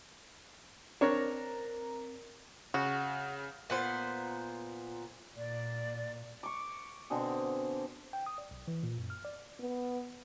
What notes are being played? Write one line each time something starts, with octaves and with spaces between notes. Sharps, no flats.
C4 D4 A#4 C#5 A#5
C#3 F#4
A#2 B3 C5
A#2 D5
C#6 D6
B2 D3 C4 G#4
G5
D#6
D5
B1
E3
A#2
F#2
F6
D5
B3